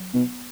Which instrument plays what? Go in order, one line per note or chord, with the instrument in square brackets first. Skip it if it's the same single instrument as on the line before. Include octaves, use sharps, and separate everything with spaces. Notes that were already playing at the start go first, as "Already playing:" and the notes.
Already playing: [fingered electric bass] F#3
[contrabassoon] B2 [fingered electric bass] B3